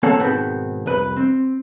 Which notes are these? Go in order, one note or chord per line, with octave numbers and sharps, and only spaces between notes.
A#3 C4 A4 C#5 F#5 A5
G#2 B2 D#3 B3 C4
C2 F2 B4
C4